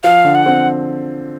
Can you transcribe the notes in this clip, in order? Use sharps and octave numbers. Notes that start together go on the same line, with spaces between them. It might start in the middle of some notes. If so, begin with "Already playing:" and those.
F3 F5
D3
F#5
C4